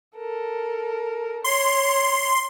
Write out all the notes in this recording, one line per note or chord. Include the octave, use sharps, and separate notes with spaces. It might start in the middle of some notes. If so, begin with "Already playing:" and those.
A4 A#4
C#5 C6